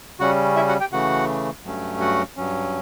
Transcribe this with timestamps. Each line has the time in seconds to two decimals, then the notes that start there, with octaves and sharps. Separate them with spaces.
0.19 C#3 G3 C#4 F#4 F#5
0.56 E4 E5
0.68 F#4 F#5
0.80 G4 G5
0.92 C#3 E3 A3 F#4 F#5
1.65 G2 F#3 A3 C#4
2.01 F#4 F#5
2.37 G2 F#3 C#4